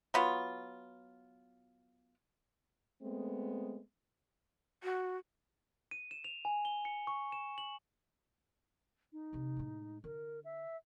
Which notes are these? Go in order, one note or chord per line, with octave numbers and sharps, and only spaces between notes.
F#3 B3 F4
G#3 A3 B3 C4
F#4
D#7
E7
F7
G#5
G7
C#7
C#6
E7
F#7
D#4
E2 C3
A2 G#3
D3 A#4
E5